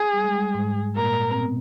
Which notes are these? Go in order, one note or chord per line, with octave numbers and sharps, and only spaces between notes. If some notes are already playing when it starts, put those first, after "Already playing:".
Already playing: G#4
G3
G#3
G3
G#2 G#3
A#2 A#3 A#4
C4
B2 B3